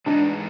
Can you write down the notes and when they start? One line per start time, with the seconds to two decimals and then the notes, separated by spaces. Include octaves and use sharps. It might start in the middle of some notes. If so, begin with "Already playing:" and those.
0.06 G#2 E3 G#3 B3 D4 D#4